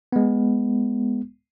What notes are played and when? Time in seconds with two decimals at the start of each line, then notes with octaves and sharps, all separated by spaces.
0.12 G#3 B3